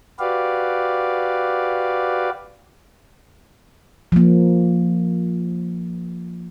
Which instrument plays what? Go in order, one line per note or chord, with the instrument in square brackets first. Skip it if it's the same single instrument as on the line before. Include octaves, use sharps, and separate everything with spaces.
[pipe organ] F#4 G4 B4 D5 F5
[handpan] F3 A#3